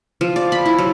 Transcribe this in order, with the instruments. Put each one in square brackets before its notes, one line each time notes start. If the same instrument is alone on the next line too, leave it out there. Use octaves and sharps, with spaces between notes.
[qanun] F3
D5
B5
E4
F#3